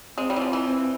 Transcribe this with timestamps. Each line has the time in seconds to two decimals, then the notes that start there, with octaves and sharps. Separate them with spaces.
0.17 G#3 C4
0.30 G3
0.36 E3
0.41 F3
0.53 E3
0.65 C4